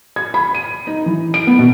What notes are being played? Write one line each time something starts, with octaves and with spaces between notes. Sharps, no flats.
G#6
B5
D#7
D#4
E3
D7
B3
B2